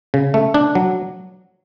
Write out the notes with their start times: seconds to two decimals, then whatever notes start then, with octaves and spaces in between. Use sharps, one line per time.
0.14 C#3
0.34 A3
0.54 D4
0.75 F#3